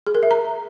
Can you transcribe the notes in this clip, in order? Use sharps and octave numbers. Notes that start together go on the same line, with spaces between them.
G#4
A#4
E5
A#5